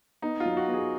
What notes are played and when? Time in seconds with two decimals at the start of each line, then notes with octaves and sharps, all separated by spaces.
0.22 B3 D#4
0.40 F4
0.45 F#3
0.57 F#4
0.68 B3
0.74 G#4